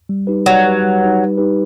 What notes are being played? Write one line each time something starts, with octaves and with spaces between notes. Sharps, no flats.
G3
D#4 G4 B4
F#3 G3
D#4 G4 B4
G3
D#4 G4 B4
G3
D#4 G4 B4